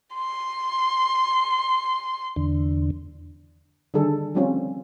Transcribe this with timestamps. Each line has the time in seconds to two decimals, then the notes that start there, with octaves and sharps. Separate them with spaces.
0.14 C6
2.36 E2 D3
3.94 D3 D#3 G3 G#4 A4
4.35 F3 G3 A3 C4 C#4 F4